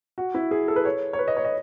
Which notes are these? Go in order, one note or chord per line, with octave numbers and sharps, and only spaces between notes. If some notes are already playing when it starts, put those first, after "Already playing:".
F#4
E4
G#4
A4
B4
C#5
C#5
B4
D#5
C#5
D#5